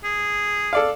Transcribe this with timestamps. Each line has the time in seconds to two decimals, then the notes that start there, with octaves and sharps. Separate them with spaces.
0.04 G#4
0.73 A4 D5 F5